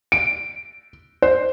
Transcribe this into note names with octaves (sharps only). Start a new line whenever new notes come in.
D7
C5